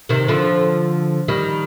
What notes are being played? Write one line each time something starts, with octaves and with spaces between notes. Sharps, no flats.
C3 D#3
D3 F3
D#3 G3